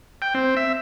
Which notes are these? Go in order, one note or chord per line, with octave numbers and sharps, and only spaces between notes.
G5
C4
E5